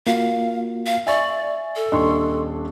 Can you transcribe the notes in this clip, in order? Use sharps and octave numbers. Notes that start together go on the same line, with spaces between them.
A#3 F4 F#4 F5
F5
D5 E5 G#5 C#6 A6
A4
D#1 D4 D#5 C6 C#6